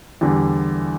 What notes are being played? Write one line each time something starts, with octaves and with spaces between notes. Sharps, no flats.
E2 D3 G3